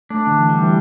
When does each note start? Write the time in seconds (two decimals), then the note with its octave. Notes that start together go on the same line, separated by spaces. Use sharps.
0.10 A3 D4
0.27 D3
0.38 E3
0.50 G3
0.63 E3